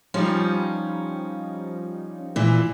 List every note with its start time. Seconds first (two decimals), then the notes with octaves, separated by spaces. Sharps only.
0.14 F3 G3 C#4 D#4
2.36 A#2 E3